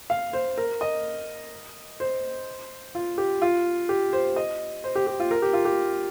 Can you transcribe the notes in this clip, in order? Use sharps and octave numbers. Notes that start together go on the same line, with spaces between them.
F5
C5
A#4
D#5
C5
F4
G4
F4
G4
C5
D#5
C5
G4
G4
F4
A#4
G4
F4
G4